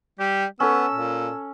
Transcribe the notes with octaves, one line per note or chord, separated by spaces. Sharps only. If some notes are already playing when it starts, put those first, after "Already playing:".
G3 G4
B3 C#4 A4 E6
A#2